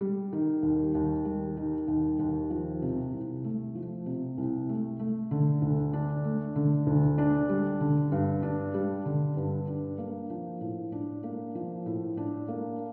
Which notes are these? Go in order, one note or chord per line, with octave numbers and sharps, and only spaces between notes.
G3
D#3
D#2
D#2
G3
D#3
D#2
D#2
F3
C3
C2
A3
F3
C3
C2
A3
A3
D3
D2
D4
A3
D3
D2
D4
G3
D3
G2
D4
G3
D3
G2
D4
A#3
F3
A2
D4
A#3
F3
A2
D4
A#3